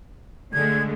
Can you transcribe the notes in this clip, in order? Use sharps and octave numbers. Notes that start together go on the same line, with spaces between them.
D3 G#3 A3 G#6